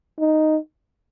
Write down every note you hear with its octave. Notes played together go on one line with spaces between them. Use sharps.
D#4